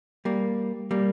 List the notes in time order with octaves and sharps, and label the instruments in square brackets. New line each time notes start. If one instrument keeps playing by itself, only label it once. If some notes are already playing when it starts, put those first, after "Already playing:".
[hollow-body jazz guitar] G3 A#3
G3 A#3